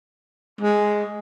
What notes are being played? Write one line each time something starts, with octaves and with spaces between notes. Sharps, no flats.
G#3